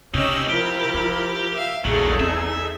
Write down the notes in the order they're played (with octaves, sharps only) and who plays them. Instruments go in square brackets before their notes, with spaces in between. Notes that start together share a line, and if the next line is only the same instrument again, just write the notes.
[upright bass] C3 [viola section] C#4 D#5 [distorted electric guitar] D#4 G4 [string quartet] E6
[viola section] F3 A#4 [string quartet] E4 [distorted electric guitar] G4 G5
[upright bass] F4
[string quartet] E5 F5
[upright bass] A#1 [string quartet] E2 [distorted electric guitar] G2 F#3 [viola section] D#4 G#4 A4
[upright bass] C4 [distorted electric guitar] E5